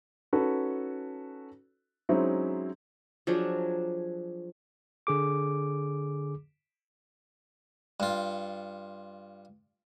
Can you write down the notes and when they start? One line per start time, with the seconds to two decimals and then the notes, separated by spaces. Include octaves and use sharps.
0.33 C#4 D#4 F#4 A4 B4
2.09 F#3 G#3 C4 C#4 D#4 E4
3.27 F3 F#3 D4 G#4
5.07 D3 G#4 D6
8.00 G2 F4